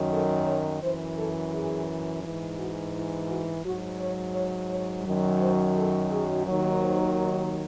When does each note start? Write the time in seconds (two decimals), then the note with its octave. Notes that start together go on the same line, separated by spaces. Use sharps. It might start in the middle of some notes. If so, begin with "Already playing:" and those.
Already playing: F#2 D#3 F#3
0.12 A4
0.47 C#5
0.83 F#2 E3 C5
1.18 A4
1.53 G#4
2.24 G#2 E3
2.59 F#4
2.95 E4
3.30 F#4
3.64 G#2 F#3 F#4
4.00 C#5
4.34 C#5
4.70 C#5
5.05 F#2 D#3 F#3
5.41 C5
5.76 A4
6.12 G#4
6.46 D#2 D#3 F#3 C#5
6.81 C5